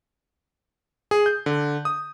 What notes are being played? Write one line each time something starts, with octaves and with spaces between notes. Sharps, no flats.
G#4
G6
D3
D#6